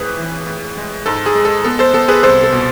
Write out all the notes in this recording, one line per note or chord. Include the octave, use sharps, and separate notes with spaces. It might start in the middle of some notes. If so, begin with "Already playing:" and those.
Already playing: F2 A2 G#4 B4
E3
A2
G#3
G#2 A4
G#4
G#3
A4
B3 A4
A4 C5
B3 A4
G#4 B4
C2 A4 C5
A4
B2